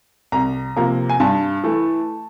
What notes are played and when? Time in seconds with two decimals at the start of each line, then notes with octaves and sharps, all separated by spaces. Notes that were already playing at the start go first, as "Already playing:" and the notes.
0.32 C2 A#5
0.76 C3 F3 A#3 A#5
1.10 G#5
1.20 G2 A5
1.64 E3 A3